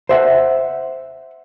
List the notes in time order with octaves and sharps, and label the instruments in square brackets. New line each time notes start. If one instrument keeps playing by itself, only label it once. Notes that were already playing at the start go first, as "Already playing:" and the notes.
[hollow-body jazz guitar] C5 E5 F#5